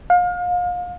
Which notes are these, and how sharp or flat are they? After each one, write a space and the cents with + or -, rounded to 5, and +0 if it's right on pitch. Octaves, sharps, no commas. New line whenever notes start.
F5 +35